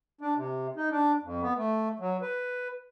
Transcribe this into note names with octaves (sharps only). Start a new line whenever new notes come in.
D4
C3
D#4
D4
F2
B3
A3
F#3
B4